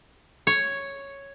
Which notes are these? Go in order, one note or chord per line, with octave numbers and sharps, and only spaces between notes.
C#5